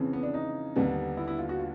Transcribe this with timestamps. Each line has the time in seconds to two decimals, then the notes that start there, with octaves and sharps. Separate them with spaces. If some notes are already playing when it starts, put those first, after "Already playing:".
Already playing: F2 C#3 E3
0.13 B3
0.23 D4
0.34 D#4
0.76 D#2 D3 G3 B3 D4
1.17 E4
1.28 E4
1.39 F4
1.49 F#4
1.59 F4